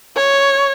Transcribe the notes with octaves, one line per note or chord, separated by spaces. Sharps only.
C#5